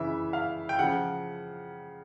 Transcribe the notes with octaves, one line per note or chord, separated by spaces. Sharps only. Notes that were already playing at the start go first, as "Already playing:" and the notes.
Already playing: C#3 E3 E5
F5
G5
C#3 F3 F#5